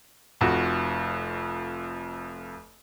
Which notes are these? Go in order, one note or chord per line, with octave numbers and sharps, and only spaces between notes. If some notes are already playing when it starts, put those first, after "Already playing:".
F1 F2 F#4